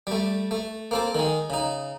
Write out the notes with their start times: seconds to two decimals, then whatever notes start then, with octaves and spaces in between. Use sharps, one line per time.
0.07 G3 A3
0.51 A3
0.91 A#3 C4 A4
1.15 D#3 G#3
1.50 C#3 D#4